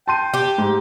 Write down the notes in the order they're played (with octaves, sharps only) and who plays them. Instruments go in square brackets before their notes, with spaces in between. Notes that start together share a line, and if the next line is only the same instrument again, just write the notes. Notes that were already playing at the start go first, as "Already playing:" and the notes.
[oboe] G5 [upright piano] A5 C6 D#7
[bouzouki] G4
[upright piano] G#2